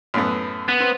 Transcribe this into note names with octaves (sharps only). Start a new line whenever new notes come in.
F#2 A2 B3
B3
C4